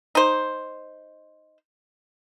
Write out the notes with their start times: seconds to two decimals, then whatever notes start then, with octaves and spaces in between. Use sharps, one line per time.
0.15 D#4 C5